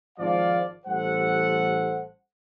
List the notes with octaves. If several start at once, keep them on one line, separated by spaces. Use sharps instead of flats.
G#1 F3 D5 F5
A1 G3 A4 C5 F#5